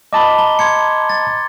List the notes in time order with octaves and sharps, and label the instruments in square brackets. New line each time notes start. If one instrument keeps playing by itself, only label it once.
[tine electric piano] D#5 A5 B5 [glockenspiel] D6 G7
[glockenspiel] A#5 G7
C6 G#6 C#7
A6